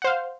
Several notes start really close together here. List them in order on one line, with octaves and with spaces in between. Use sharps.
F#5 C5 F5